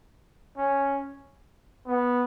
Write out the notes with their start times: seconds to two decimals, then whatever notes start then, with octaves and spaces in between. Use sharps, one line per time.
0.57 C#4
1.87 B3